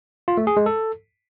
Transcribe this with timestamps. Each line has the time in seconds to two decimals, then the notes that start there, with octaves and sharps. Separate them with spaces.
0.28 F4
0.37 A3
0.47 G#4
0.57 G#3
0.66 A4